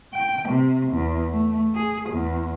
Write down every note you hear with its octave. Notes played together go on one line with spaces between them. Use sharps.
G5
C3
E2
A3
G#4
E2